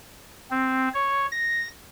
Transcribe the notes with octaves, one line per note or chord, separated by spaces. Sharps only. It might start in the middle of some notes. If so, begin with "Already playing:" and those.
C4
C#5
A#6